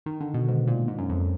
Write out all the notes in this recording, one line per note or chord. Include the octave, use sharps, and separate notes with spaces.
D#3
D3
B2
G#2
A#2
G#2
F#2
F2